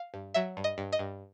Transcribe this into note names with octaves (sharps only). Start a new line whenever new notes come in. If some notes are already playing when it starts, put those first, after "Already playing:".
Already playing: F5
G2
F#3 E5
G2
D#5
G2
D#5
G2